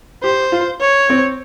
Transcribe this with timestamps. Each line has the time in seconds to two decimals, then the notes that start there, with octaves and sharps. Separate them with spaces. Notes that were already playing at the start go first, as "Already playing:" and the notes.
0.23 G4 C5
0.52 F4
0.81 C#5
1.09 C4